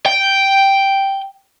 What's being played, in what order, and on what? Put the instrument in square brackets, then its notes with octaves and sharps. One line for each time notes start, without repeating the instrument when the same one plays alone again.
[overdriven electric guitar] G5